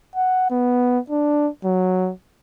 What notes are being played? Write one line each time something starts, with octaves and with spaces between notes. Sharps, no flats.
F#5
B3
D4
F#3